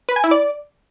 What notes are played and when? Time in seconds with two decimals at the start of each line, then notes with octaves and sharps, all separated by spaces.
0.09 B4
0.16 G#5
0.24 E4
0.31 D5